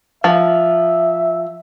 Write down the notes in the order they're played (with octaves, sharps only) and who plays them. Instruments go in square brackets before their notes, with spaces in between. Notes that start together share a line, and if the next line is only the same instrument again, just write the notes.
[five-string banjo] F3 [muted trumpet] E5